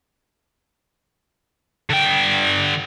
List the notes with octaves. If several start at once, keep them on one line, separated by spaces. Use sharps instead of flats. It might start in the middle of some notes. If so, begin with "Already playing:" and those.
D3 G5